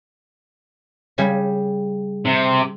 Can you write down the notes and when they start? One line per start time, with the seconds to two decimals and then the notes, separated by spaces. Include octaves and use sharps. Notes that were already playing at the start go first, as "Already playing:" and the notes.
1.18 C#3 G3 G#5
2.25 C3